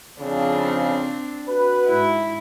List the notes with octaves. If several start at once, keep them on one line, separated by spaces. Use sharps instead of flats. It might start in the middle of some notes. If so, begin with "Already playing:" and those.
F2 C#3 C4 D4
F#4 B4
G#2 E4